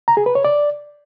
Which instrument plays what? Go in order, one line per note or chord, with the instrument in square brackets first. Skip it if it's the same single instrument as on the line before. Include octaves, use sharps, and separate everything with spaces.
[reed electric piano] A#5
G#4
B4
C#5
D5